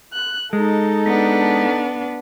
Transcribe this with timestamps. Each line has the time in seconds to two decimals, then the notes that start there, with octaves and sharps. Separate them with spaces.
0.13 F#6
0.53 G#3 D#4 A4
1.07 B3 D4